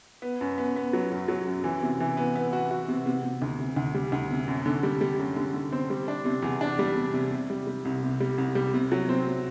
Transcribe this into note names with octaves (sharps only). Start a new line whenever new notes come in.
B3
F#2
B3
B3
F#3
F#2
F#3
F#2
E3
C3
E3
B3
B3
F#4
F#4
C3
C3
C3
D2
C3
D2
G3
D2
C3
F#2
D3
G3
G3
F#2
D3
D3
C4
G3
D4
C3
E2
D4
G3
C3
C3
C3
G3
G3
C2
C3
G3
C2
G3
C3
F#3
C4
C3